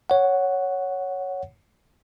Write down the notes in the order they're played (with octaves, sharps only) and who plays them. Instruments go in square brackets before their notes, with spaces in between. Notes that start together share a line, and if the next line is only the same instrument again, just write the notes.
[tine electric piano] C#5 F#5